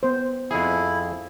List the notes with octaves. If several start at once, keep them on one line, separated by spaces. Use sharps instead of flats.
B3 C5
F2 E4 G#4